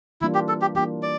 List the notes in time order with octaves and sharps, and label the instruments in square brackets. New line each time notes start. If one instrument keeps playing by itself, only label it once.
[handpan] E3 G3 A#3 D4 F4 [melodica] E4
[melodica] G4
A4
G4
[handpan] E3 G3 A#3 D4 F4 [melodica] G4
[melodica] D5